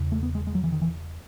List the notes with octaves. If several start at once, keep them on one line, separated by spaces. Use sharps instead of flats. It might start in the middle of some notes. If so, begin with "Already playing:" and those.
Already playing: E1 E2 C#3
A3
B3
G#3
G#3
F#3
E3
D#3
E3